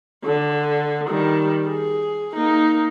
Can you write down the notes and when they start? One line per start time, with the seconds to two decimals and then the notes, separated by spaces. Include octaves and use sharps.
0.24 D3
1.09 D#3 G3
1.67 G#4
2.34 A#3 D#4